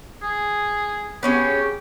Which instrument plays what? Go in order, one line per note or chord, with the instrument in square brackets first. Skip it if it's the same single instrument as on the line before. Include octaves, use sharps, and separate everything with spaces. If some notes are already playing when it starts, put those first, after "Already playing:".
[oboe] G#4
[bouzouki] B3 C#4 G#4 [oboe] G4